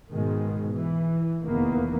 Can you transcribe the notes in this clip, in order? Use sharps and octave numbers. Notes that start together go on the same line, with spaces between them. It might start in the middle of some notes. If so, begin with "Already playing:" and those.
G#2 B2 D#3 G#3
E3
F1 E2 D#3 E3 A#3 B3